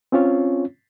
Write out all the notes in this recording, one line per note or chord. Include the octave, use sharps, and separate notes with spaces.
C4 C#4 F4 C#5